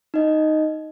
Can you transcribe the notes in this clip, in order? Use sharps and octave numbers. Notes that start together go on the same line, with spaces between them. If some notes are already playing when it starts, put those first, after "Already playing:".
D#4 D#5